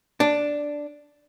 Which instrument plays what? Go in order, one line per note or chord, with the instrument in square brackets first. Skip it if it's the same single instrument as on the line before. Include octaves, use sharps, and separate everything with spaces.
[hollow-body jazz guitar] D4